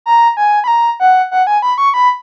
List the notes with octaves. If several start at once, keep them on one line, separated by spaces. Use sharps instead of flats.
A#5
G#5
B5
A#5
F#5
F#5
G#5
B5
C#6
B5